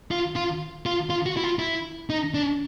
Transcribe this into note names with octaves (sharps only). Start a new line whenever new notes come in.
F4
F4
F4
F4
F#4
E4
F4
E4
D#4
D4